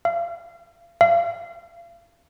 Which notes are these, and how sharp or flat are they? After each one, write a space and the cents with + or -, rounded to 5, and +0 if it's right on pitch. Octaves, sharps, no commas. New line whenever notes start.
F5 -40
F5 -40